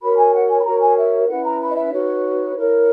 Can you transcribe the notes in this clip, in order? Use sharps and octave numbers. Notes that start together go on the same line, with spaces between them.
F#4 A#4 C#5 B5
G#5
F#5
G#5
B5
F#4 A#4 C#5 A#5
G#5
E5
C#4 E4 B4 F#5
A#5
B5
D#5
E5
D#4 F#4 B4 C#5
E4 A#4 C#5